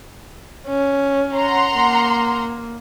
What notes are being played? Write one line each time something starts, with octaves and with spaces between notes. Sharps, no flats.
C#4
F#5 A#5 C6
A#3